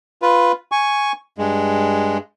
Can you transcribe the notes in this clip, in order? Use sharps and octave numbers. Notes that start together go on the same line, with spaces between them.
F4 B4
G#5 C#6
G2 G#3